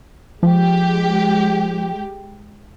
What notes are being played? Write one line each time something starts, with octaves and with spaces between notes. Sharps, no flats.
F3 G#3 G4